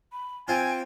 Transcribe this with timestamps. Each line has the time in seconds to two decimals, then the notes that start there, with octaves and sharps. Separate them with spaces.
0.12 B5
0.48 C4 F4 G5 G#5